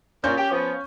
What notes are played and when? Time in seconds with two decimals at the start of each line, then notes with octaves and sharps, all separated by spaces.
0.24 A#2 C#4 G6
0.38 G4
0.51 F3 B3